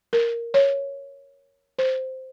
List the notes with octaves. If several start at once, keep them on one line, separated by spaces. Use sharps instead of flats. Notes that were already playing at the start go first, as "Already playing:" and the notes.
A#4
C#5
C5